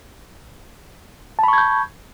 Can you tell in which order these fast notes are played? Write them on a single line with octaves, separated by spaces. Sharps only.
A5 B5 C#6 G#6 G6